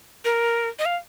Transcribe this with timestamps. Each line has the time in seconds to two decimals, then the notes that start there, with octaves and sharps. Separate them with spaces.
0.25 A#4
0.79 D#5
0.86 F5